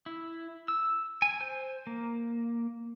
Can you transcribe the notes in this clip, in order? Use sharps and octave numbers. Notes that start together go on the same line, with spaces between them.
E4
E6
G#5
C5
A#3